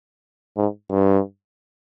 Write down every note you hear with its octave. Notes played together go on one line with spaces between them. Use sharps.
G#2
G2